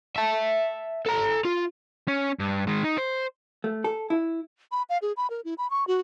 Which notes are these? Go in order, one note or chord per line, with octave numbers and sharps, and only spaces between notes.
E5 A5
A4 A#5
F4
C#4
G2
D#3 G#3
D#4
C5
A3
A4
E4
B5
F5
G#4
B5
A#4
E4
B5
C#6
F#4